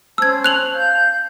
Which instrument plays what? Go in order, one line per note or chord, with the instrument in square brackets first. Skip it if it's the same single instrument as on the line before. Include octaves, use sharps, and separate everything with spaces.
[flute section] C#4 C5 A5 [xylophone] E6 G#6
[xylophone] F#6 F7 F#7
[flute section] F5 G6